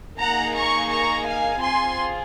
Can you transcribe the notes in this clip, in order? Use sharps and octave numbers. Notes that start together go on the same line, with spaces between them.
A#3 D#4 G#4 F#5 A#5
A#5 C#6
A#5 C#6
F5 G#5
C4 F4 G#4 G#5 C6